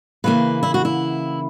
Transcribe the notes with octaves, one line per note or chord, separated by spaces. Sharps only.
C#3 E3 A#3 B4
E4
F#4
E4